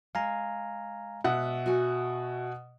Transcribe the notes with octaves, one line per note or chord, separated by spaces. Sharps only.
G#3 F5 G#5 A#5
B2 E5 F#5
F#4 G#5